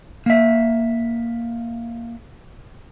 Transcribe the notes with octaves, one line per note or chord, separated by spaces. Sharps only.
A#3 E5